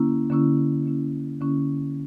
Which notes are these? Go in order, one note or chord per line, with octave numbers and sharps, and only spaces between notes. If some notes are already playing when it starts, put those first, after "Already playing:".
Already playing: D3 A#3 C#4 E4
D3 A#3 C#4 E4
D3 A#3 C#4 E4
D3 A#3 C#4 E4